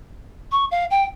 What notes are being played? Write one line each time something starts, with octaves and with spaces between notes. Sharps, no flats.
C#6
F5
G5